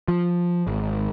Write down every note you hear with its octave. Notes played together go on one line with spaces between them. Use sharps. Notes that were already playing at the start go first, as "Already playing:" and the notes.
F3
G#1